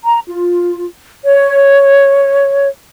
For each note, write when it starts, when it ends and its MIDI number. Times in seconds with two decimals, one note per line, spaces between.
0.05 0.20 82
0.27 0.87 65
1.25 2.68 73